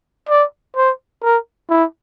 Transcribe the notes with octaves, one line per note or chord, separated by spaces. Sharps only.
D5
C5
A#4
E4